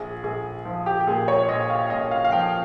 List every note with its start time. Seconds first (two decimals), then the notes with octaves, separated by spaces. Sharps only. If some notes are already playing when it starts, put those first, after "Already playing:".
Already playing: A#1 G#4
0.24 A#1 G#4
0.65 F3
0.86 G4
1.01 G4
1.07 A#2 G#4
1.28 C#5
1.49 A#1 D#5
1.70 F5
1.90 A#1 D#5
2.11 F5
2.25 F5
2.32 F3 G5